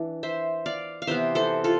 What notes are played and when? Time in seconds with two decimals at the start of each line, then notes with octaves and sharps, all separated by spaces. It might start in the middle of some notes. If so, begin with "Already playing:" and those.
Already playing: E3 D4
0.23 C5 E5
0.66 D5 F5
1.02 F5
1.07 C3 E3 B3 C5 E5
1.35 A4 C5
1.64 F4 A4